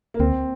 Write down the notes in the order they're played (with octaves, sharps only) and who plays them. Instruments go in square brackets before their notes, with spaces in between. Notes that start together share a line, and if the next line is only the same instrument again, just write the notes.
[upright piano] A#3
[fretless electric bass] D2 [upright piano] C4